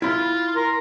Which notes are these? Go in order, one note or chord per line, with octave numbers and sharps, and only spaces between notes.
E4 F4 B5
A#4 A#5 C6